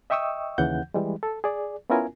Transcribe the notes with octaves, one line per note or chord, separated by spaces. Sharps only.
D#5 E5 G5 C#6 D#6 E6
D#2 C#3 E3 F#5 G6
E3 G3 G#3
A4
G#4 D5
B3 C#4 E4 F4 A#4 G#5